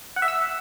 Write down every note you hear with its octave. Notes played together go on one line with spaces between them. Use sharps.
F#5
E5
E6